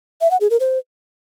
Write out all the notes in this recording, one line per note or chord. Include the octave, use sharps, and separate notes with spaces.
E5
F#5
G#4
A#4
C5